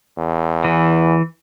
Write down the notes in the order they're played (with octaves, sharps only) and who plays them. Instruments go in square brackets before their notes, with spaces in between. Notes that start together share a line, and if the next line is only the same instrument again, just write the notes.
[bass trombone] E2
[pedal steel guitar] E3